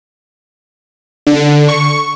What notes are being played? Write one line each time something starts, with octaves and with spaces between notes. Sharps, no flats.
D3
C#6